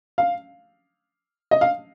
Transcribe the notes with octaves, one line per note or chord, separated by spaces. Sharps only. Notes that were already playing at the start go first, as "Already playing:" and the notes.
F5
D#5
F5